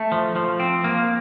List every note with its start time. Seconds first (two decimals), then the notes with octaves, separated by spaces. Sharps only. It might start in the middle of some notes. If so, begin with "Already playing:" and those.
Already playing: A3
0.12 F3
0.36 F3
0.60 C4
0.84 A#3